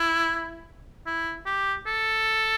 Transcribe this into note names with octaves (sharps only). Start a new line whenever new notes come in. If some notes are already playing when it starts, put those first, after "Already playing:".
Already playing: E4
E4
G4
A4